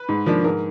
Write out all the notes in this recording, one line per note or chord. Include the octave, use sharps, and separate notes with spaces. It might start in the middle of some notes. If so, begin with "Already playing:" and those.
Already playing: B4
G#2
F3 A#3 D4
G#2 A#4